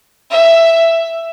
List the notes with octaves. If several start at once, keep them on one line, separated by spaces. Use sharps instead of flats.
E5